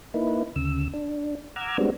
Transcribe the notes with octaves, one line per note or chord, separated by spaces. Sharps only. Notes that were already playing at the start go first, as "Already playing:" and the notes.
A#3 D#4 E4 B4
D2 C#3 E6
D4
F#5 A#5 D6 E6 F6 G#6
G3 G#3 B3 C4 D4 F#4